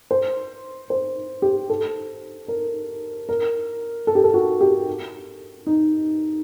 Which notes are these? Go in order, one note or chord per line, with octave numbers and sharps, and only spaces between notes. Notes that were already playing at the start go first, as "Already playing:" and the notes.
C5
C5
G4
A4
A#4
A#4
A4
G4
A4
F#4
G4
D#4